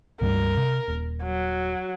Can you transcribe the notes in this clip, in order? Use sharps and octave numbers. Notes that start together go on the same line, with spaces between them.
C#2 G2 G3 A#4
C3
D#1
F#3